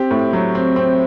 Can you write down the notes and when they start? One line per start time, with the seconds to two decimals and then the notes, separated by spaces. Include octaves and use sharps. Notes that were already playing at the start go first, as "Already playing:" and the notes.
Already playing: C4 G4
0.11 A2
0.33 F#3
0.55 C4
0.76 C4